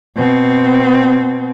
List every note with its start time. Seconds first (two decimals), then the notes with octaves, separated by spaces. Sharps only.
0.16 B2 C4